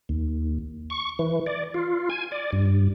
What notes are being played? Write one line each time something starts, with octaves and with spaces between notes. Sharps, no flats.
D#2
C#6
E3
D5
F4
G#5
D5
G2